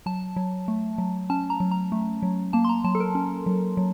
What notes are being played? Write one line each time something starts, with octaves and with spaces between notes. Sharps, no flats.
F#3 A5
F#3
A3
F#3
C#4 A5
A#5
F#3
A#5
A3
F#3
A#3 A5
C6
A#5
F#3 A5
A4
A#4
C#4
F#3
F#3